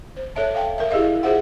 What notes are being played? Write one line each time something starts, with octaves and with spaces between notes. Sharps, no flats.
C5
A4 C#5 E5 A5
F5 G5 A5
A#4 E5
E4 G4 G#4 D#5 F5
F4 G#4 C5 E5 F#5